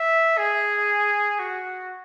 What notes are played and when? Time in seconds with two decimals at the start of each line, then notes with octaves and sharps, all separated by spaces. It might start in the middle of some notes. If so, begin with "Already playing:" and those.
Already playing: E5
0.38 G#4
1.39 F#4